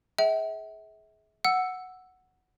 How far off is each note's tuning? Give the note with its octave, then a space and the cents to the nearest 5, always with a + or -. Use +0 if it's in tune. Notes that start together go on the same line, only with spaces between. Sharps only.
G#4 +20 E5 -35 G5 -40
F#5 +0 E6 +0